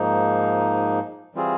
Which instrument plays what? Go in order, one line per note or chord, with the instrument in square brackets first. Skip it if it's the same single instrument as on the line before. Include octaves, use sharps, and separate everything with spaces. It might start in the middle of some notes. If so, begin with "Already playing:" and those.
Already playing: [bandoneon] G#2 F3 A#3 D#4
E3 G3 C4 F4 G#4